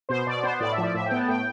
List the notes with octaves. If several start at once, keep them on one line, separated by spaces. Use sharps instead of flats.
B2 C5
B2 D5
B3 C5
A2 D5
E5
F3
D5
A2 E5
G5
B3
A5
A2 G5